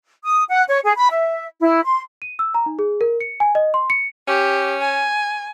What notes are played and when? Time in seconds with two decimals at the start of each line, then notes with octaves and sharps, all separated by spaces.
0.24 D#6
0.49 F#5
0.68 C#5
0.84 G#4
0.96 B5
1.10 E5
1.60 E4
1.84 C6
2.22 D#7
2.39 E6
2.54 A#5
2.66 D#4
2.79 G#4
3.01 A#4
3.20 C#7
3.40 G#5
3.55 D#5
3.74 C6
3.90 C#7
4.28 C#4 G4
4.81 G#5